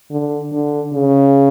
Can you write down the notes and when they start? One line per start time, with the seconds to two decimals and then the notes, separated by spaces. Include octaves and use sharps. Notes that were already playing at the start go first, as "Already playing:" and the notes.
0.11 D3
0.52 D3
0.94 C#3